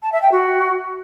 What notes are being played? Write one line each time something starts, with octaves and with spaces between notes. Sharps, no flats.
A5
E5
G5
F#4